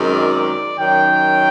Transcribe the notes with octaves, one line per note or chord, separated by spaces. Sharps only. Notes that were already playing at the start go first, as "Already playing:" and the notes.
Already playing: F#2 D#3 G#3 C4
D5
F#2 D#3 F#3 G5